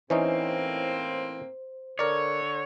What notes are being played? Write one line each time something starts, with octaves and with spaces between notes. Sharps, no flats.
A2 E3 A#3 C4 C#4 D#4 C5
D3 A#4 C#5 D5